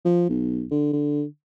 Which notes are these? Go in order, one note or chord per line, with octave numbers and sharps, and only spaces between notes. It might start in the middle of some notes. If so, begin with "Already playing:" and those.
F3
B1
D3
D3